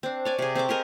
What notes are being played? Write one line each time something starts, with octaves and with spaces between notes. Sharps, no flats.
C4 D4
C#5 D5 G#5
C3 G#4
C4 A4 C#6 D6
G4 G#4 A#4 D#5